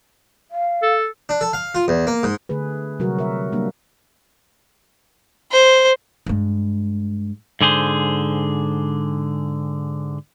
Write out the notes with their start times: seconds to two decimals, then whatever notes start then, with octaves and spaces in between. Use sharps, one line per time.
0.51 F5
0.83 A4
1.29 D4
1.41 A4
1.53 F5
1.75 F4
1.88 E2
2.07 A#3
2.23 G#2
2.49 D3 A3 G#4 B4
2.99 C3 F#3 G3 F#4 A#4
3.19 A#4 E5
3.52 G3 A#3 D4
5.51 C5
6.26 G2 G#3
7.61 G#2 D3 G#4 C5